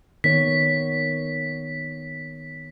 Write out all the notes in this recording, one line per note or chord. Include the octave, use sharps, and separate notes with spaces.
D#3 B3 C#5 B6